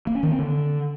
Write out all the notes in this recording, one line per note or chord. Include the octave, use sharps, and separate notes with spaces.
A#3
C#4
D#3
C4
D3